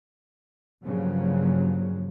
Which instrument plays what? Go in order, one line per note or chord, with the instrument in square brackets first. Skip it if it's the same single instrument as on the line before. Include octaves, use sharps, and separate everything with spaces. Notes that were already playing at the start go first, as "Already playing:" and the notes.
[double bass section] G2 C#3 F3 F#3 A#3